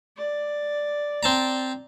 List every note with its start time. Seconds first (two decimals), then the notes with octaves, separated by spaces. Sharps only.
0.18 D5
1.23 C4 A5 A#5